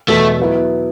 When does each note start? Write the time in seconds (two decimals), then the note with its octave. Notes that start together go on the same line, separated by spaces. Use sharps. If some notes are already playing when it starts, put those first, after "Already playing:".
0.08 E2 B2 A3 B3
0.40 F#3 B3 E4